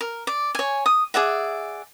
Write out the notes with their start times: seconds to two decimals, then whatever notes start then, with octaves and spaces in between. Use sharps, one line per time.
0.01 A#4
0.27 D5
0.55 C#5 G#5
0.86 D#6
1.14 G#4 D5 E5 F#5